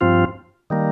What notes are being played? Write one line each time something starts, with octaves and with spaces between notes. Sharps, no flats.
G2 F3 C4 F4
D#3 G3 A#3